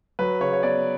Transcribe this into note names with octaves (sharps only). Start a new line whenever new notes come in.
F#3 B4
C#3 C#5
C#5
B3 D5